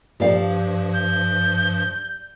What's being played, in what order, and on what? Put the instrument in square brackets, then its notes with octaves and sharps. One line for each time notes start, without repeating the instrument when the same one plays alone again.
[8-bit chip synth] G2 F3 [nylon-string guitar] G4 D5 F5
[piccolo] G6